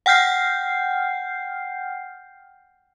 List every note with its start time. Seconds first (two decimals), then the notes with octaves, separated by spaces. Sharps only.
0.06 F#5 G5 F6 G6 C7